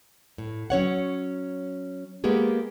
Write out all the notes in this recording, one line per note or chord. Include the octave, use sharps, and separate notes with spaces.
A2
F#3 C#4 C#5 F#5
G#3 A#3 B3 G4 G#4